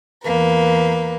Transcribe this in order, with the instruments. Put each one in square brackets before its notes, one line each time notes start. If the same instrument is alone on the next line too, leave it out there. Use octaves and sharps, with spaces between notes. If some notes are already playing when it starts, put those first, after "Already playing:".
[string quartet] E2 A#3 B4